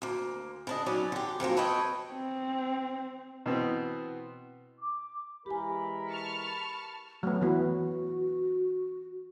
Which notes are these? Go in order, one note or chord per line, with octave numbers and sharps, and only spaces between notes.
D2 A#3
C#3 D4 D#5
D#3 F#3 B3 C#4 D5
D3 G4
F2 G#2 F#3 A#3
A4 B4 C#5 D#5 G5
C4
B2 E3 B3 C4
D6
E3 G#3 G4 A#4 G#5 B5
A5 C#6 F6
F#3 A3 B3
E3 B3 F#4